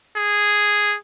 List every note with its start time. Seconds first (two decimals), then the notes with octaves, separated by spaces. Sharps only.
0.17 G#4